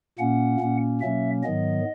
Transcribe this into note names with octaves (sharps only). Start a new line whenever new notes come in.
A#2 A#3 C#4 F#5
A#2 A#3 C#4
B2 F#3 A#3 C#4 E5
G#2 D#3 F#3 B3 D#5